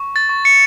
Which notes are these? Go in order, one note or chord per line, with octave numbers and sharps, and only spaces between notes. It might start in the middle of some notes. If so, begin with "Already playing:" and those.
Already playing: C#6
A6
C#6
C#7